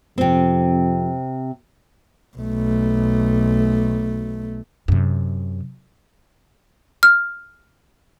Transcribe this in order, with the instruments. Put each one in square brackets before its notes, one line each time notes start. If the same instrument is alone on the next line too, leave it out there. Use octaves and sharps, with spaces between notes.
[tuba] F2 [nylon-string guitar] C3 C4
[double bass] B1 A3
[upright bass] F#2 C3
[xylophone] F6